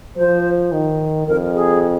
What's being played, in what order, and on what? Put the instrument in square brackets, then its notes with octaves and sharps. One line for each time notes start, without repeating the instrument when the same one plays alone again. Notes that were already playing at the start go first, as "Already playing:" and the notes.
[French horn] F3 [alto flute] C5
[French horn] D#3
[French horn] F2 [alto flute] A#4
[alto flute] G#4